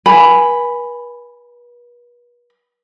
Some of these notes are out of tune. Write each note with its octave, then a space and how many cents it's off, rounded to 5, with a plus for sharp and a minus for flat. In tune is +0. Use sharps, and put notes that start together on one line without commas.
B4 -40 G#5 +0 B5 +5